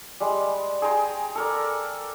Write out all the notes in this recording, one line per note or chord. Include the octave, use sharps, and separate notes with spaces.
G3 G#3
G#4 G5 A#5 C6
A4 A#4 D5